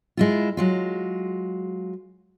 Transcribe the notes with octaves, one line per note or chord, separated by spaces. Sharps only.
G#3 E4 F4
F#3 G#3 F4